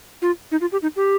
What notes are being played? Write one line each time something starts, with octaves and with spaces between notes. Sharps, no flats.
F4
D#4
F4
G4
D#4
G4